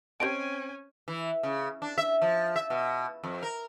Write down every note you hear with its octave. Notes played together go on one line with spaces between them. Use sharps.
C4 C#4 G4 C5 D#5 G#5 A5 D7
E3
C#3
D4
E5
F3
E5
B2
F2
A#4